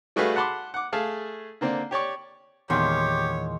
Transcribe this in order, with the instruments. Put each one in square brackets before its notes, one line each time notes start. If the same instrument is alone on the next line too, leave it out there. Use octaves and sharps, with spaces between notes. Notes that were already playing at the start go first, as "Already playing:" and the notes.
[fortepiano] G3 A3 F#4 G#4 B4 F5
F#5 A5 B5 C6 D6
F#5 D6
A3 G#4 F5 A5
D3 A#3 C4 D4
G4 C#5 D5 C#6
[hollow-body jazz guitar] E2 A#2 D#3 [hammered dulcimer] G#3 C6 [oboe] G4 [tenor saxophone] C#5